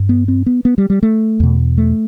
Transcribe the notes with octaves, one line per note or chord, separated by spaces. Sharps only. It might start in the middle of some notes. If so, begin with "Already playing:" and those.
Already playing: G2
B3
C4
B3
B3
G3
G3
A3
E2 B2
A3